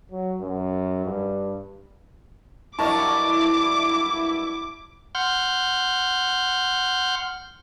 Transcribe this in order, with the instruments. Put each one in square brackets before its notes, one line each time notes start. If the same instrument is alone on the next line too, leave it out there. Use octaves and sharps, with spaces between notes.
[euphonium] F#3
F#2
G2
[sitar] G2 F#3 A#4 [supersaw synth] E4 [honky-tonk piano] D#5 A5 C#6 [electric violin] D6
[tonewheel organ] F#5 C6 F6 G6